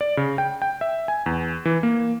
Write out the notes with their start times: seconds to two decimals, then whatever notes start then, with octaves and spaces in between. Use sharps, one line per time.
0.01 D5
0.17 C#3
0.38 G5
0.62 G5
0.81 E5
1.08 G#5
1.26 E2
1.65 E3
1.83 A#3